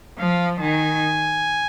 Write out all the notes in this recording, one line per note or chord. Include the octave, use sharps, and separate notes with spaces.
F3 F5
D#3 G#5